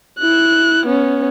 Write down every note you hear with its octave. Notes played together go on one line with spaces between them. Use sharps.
E4 F#6
B3 C#4